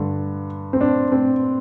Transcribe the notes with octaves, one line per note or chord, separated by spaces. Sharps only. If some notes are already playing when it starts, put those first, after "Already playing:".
Already playing: G2 D3
C4
D4
C4